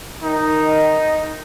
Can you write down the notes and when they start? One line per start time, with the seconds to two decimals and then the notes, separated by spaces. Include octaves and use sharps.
0.23 D#3 D#4